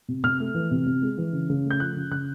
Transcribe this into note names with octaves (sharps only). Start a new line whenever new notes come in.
C3
C3 F6
A3
E3
C3
C3
G#3
E3
C#3
C#3
A3
G6
F3 F#6
C#3
C#3 F#6